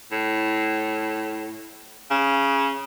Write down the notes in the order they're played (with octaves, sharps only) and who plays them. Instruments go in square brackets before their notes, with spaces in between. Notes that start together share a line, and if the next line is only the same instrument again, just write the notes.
[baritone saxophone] A2
C#3